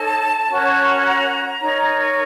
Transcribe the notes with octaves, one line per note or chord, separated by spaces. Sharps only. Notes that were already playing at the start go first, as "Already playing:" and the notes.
Already playing: D#4 A4 C#5 A5
C#4 F#4 A#4 C#5
A#5
D#4 A#4 C#5